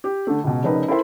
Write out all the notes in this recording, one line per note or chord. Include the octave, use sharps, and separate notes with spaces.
G4
D3 A3
C#2 B2
F1 C#3 D#4 A#4 B4
E4 A4 A#4 C5 E5 C6